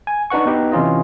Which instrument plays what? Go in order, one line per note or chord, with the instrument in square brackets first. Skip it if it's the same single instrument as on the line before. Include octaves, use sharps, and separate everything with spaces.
[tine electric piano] G#5
D4 D#4 B4 F#5 C#6
B3 D#4 G4 B4
C3 E3 C#4 F4 D#5